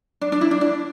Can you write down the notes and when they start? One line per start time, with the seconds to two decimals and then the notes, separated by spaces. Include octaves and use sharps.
0.21 D4
0.32 D4
0.41 E4
0.51 D4
0.61 D4